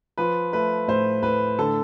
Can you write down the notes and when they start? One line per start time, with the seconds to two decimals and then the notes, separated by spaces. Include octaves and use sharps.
0.18 F3 B4
0.53 A3 B4
0.88 A2 C5
1.23 A2 B4
1.59 D3 A4